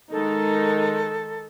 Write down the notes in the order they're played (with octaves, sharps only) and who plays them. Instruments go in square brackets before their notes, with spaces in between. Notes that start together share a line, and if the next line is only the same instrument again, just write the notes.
[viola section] D#3 G#3 D#4 [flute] A4